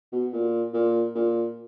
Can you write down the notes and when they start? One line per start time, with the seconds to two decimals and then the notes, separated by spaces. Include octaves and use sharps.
0.13 B2
0.33 A#2
0.73 A#2
1.15 A#2